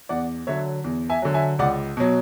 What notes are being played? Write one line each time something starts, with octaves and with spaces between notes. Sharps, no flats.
E2 D5 F#5
D3 F#3 C#5 E5
E2
E5 G#5
D3 F#3
E5 G#5
C#2 D5 F#5
B2 F#3